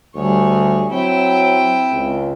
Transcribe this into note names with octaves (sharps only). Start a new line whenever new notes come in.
D2 G3 G#4 C#5
F#3 C4 E4 G5
C#2